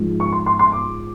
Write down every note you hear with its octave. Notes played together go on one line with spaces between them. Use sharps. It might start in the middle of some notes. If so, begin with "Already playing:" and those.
Already playing: G#2 F3 G#3
C#6
C6
C6
C6
D6